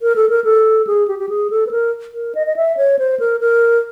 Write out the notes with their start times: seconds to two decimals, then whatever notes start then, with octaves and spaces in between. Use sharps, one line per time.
0.02 A#4
0.16 A4
0.29 A#4
0.44 A4
0.87 G#4
1.08 G4
1.19 G4
1.29 G#4
1.50 A4
1.67 B4
1.71 A#4
2.14 A#4
2.35 D#5
2.47 D#5
2.56 E5
2.77 C#5
2.99 C5
3.20 A#4
3.40 A#4